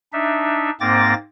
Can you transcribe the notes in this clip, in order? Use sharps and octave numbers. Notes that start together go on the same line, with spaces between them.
D4 D#4 E5
G#2 A#3 C4 D6 A6 A#6